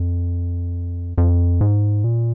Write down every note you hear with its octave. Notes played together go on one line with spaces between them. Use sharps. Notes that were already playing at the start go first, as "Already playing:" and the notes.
Already playing: F2
F2
G#2
A#2